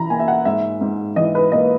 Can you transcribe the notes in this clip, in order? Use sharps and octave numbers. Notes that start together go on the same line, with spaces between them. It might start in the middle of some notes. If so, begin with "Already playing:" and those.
Already playing: E3 A#5 B5
A#3 G#5
E5
F#5
G#2 E5
G#2
E3 D#5
B4
A#3 D#5